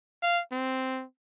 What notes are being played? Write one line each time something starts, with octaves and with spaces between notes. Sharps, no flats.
F5
C4